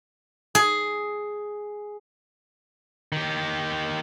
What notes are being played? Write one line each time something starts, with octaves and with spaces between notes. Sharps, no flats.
G#4
D#3 G4